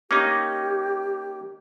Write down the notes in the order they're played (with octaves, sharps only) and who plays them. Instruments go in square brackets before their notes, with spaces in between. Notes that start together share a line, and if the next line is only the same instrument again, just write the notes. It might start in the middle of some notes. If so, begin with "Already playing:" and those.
[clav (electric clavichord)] A#3 C#4 D#4 [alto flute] G4 [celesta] D6